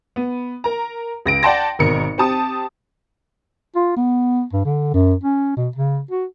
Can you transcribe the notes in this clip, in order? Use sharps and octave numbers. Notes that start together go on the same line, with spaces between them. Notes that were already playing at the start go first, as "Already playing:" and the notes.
B3
A#4 A#5
C#2 A#6 D7
D5 F#5 G5 A5 C6 A#6
G#1 B2 A#4 C#7
C4 G4 A5 D#6
F4
B3
G2
D3
F#2
C#4
B2
C#3
F#4